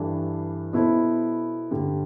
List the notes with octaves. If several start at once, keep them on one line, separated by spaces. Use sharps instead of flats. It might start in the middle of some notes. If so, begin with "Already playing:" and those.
Already playing: G2 E3 G3 D4 A4
B2 B3 E4 A4 C5
G2 D3 G3